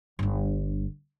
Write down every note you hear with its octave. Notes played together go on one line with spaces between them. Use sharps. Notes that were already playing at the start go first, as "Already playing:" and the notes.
G1 G2